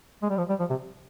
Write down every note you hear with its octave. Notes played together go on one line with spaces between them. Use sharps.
G#3
G3
F3
G3
F3
C3